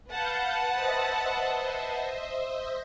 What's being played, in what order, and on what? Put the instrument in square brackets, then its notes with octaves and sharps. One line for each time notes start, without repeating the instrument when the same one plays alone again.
[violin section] B4 F#5 A5 [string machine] F5 G6
[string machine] C5 D#5 E5